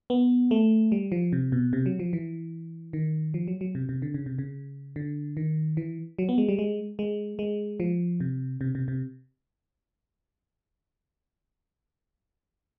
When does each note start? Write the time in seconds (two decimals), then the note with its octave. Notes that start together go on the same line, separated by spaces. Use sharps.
0.10 B3
0.51 A3
0.92 G3
1.12 F3
1.33 C3
1.52 B2
1.73 C3
1.86 F#3
1.99 F3
2.13 E3
2.93 D#3
3.34 F3
3.48 F#3
3.61 F#3
3.75 C3
3.89 C3
4.02 D3
4.14 C#3
4.26 C3
4.38 C#3
4.96 D3
5.37 D#3
5.77 E3
6.19 F#3
6.29 B3
6.38 G#3
6.49 G3
6.59 G#3
6.99 G#3
7.39 G#3
7.80 F3
8.20 C3
8.61 C3
8.75 C3
8.88 C3